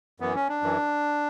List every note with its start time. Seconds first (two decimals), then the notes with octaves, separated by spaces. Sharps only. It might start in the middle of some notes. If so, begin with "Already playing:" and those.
0.20 F#2 E3 B3
0.35 C#4
0.49 D4
0.63 F#2 E3